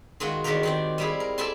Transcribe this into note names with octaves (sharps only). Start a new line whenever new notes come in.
D#3 G#3 F4 F#4 D#5
E2 D#3 C4 F#4 G4 A#4
D#3 C4 D5
G3 E4 G#4
A#4
A4 D5 E5 G#5 A5 C6